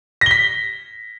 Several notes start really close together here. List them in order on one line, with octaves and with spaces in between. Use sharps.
A#6 G7 B6